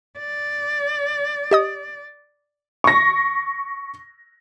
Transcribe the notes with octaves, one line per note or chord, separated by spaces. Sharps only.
D5
G4 D#5 D#6
C#6 A#6